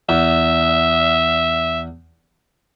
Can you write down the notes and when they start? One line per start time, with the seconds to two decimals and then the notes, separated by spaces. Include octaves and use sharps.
0.09 E2 E5